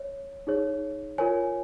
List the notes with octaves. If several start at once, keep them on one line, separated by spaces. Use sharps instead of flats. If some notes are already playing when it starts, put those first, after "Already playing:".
Already playing: C#5
D#4 G#4 C#5
F4 A#4 C#5 G#5